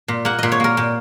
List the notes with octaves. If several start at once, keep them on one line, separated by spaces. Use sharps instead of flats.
A#2
A#3 F#5
A#2 D#5
C#5
A#3 A#4
A#2